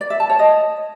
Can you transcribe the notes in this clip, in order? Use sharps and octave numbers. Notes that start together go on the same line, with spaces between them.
D5
E5
A5
C#5
D#5